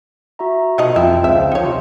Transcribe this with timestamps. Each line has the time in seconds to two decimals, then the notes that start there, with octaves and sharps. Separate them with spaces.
0.39 F#4 E5 A#5
0.78 B2 D#3 F3 D#4
0.96 F2 E4 F4 G5 A5
1.24 C#2 C4 C5 E5 F5
1.52 F3 D#4 C#5
1.65 C3 C6